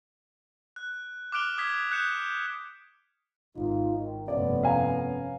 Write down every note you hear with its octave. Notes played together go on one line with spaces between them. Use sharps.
F#6
D6 F6 F#6 D7 F7 G7
D#6 G#6 B6
F#6 G6 C#7 E7
G#1 D#4 F4
D#3
F1 G2 A3 B3 C#4 D5
F5 G#5 A#5